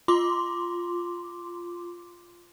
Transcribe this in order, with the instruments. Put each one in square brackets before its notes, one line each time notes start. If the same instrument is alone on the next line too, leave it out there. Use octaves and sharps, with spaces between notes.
[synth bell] F4 C6 D6